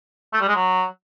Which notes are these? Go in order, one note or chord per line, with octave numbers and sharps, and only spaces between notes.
A3
G3
G#3
F#3